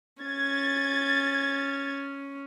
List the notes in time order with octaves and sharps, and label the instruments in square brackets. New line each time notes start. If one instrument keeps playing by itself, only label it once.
[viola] C#4 [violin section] G#6 A6